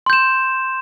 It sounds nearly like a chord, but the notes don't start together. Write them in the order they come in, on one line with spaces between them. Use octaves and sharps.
C6 G6 E7